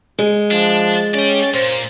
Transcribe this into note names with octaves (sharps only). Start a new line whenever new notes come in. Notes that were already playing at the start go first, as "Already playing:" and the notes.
G#3
F3 D4
C#4 D5 G5
A#2 C5